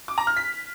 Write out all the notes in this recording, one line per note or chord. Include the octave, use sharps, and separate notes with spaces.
D6
A#5
F6
B6